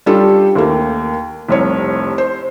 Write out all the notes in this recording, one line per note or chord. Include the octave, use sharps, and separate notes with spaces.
G3 C#4 D4 F4 G4 A4
D#2 A3 A#3
F1 C2 C#5
C5